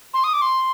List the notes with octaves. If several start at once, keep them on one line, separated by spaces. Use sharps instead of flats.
C6
D#6
D6
C6